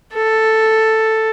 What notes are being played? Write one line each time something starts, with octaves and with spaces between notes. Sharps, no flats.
A4